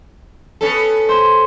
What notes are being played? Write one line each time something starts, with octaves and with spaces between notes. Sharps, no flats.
B3 C#4 A4
C5